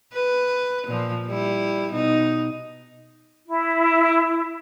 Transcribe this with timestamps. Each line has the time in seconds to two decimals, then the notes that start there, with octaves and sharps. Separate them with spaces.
0.13 B4
0.87 A#2 F3
1.28 G3 E4
1.92 B2 D#4
3.47 E4